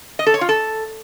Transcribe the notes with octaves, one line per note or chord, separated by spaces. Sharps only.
D#5
A4
C#5
F4
A4